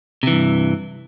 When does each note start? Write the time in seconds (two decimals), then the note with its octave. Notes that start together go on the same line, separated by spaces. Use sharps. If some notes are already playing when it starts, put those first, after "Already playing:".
0.23 C3
0.27 E3
0.32 G2